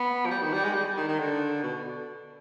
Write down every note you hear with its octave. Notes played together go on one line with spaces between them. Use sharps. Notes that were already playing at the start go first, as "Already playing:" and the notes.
Already playing: B3
F3
G3
D#3
G3
G#3
G3
D#3
D#3
D3
B2